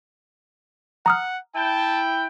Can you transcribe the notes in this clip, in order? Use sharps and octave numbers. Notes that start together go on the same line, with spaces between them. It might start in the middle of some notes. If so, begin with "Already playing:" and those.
F#5 A#5 D#6 F6
E4 G5 A5